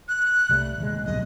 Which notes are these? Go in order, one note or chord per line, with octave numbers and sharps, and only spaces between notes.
F#6
C2 G3 A3
D#1 A1 G#3
D1 B1 G2 D#5